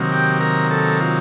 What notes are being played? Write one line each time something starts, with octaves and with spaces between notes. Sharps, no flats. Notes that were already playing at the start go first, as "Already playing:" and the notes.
Already playing: C3 D#3 F#3 A#3
G4
A#4
A4
F4